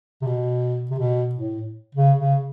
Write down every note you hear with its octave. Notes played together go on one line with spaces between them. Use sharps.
C3
B2
C3
B2
A2
C#3
C#3